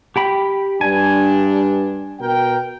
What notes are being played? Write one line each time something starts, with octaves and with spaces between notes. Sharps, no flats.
G4 G5 B5
G2 D4 G#5
B2 A#4 G5